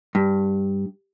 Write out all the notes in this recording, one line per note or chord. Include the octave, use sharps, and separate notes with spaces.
G2